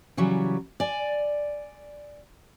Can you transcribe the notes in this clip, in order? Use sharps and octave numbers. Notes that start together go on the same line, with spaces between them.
C#3 E3 F#3 G3
D5 G#5